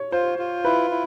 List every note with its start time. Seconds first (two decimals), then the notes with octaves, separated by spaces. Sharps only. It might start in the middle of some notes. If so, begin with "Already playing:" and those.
Already playing: C#5
0.12 F4 C5
0.39 F4
0.65 E4 B4
0.91 E4